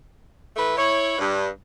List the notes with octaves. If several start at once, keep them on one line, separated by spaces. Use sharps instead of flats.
E3 A3 B4 E5
E4 C#5
G2